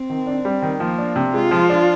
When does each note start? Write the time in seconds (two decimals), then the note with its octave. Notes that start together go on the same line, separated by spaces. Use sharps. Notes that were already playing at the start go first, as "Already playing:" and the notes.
Already playing: C4
0.10 D#3
0.27 D4
0.45 G3
0.62 D#3
0.80 F3 A#3
0.99 D4
1.16 C3
1.34 G#3 F4
1.51 F3
1.70 D4